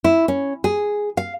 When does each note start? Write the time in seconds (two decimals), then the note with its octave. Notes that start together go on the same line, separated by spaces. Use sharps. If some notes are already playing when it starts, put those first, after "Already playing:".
0.04 E4
0.28 C#4
0.64 G#4
1.17 F5